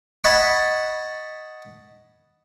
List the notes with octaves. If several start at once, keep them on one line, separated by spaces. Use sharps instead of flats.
D#5 F#5 G#5 A5 B5 C#6